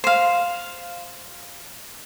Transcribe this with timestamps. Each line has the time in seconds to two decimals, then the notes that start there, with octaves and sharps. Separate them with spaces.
0.04 C5 F5